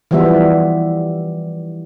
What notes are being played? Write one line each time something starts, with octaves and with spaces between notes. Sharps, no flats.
E3 F3 G3 B3 E5